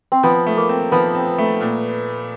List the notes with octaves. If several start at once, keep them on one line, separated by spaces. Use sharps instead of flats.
C4
F3 B3
A3
A#3
C4
F3 B3
C4
A3
A#2